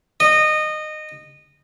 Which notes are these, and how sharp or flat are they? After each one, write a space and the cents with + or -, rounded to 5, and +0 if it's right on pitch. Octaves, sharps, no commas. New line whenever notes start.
D#5 -20